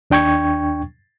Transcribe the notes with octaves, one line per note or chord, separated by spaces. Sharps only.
D#2 D4 G5 C#6 G#6